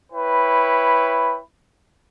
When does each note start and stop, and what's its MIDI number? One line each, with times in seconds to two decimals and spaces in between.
0.12 1.41 64
0.12 1.41 71
0.12 1.41 73
0.12 1.41 79
0.12 1.41 83